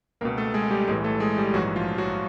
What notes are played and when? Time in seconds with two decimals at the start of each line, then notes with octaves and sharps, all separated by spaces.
0.21 C#2 B2 A#3 A#4
0.38 A3 A4
0.54 G#3 G#4
0.71 G3 G4
0.88 B1 A2 E3 G#3 G#4
1.04 A3 A4
1.20 G#3 G#4
1.37 G3 G4
1.54 A#1 G#2 E3 F#3 F#4
1.76 F3 F4
1.98 F#3 F#4